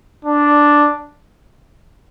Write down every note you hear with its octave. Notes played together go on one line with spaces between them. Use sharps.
D4